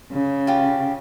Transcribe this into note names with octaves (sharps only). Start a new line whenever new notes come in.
C#3
F4 G4